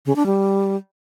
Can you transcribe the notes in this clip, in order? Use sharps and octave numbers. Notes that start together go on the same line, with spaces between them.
C#3
D4
G3